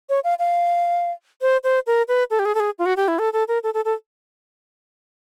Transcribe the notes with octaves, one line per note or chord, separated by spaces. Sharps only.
C#5
F5
F5
C5
C5
A#4
B4
A4
G4
G#4
A4
G#4
F4
F#4
G4
E4
A4
A4
A#4
A4
A4
A4